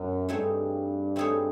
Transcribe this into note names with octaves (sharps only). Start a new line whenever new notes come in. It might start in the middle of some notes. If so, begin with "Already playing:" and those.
Already playing: F#2 B2 F#3
G2 A3 C4 D#4 G#4 C#5
A3 C4 D#4 G#4 C#5